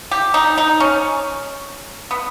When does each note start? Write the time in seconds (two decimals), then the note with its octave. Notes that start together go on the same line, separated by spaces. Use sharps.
0.11 G4
0.34 D#4
0.58 D#4
0.80 C#4
2.11 B3